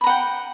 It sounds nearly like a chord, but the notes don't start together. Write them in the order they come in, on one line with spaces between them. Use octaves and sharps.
B5 A#5 F#5 G5